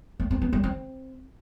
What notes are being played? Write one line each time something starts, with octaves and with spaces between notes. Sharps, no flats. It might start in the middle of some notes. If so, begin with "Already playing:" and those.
A3
C4
B3
G3
C4